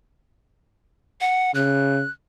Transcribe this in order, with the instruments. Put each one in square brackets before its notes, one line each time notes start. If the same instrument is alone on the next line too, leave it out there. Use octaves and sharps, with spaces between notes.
[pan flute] F#5
[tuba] C#3 [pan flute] F#6